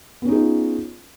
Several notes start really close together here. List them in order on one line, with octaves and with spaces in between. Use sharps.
B3 C#4 D#4 G#4 F4